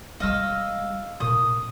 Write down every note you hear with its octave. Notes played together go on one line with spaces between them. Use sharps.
G3 G#3 D#5 F5 E6
A#2 D#6